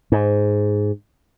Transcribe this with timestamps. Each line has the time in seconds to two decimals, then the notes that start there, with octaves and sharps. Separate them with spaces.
0.12 G#2